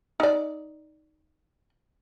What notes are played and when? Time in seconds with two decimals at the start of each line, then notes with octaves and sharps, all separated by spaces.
0.20 D#4 D5